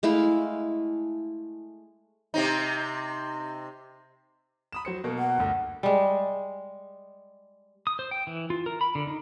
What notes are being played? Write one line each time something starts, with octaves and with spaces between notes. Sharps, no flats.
G#3 A3 E4 F5
C3 C4 D#4
B5 D#6 E7
F#3 C5 C#7
B2 A#3
F#5
G1 D2
G3 G#3
D#6
C5
G5
E3
F4
A#4
B5
D3
D#4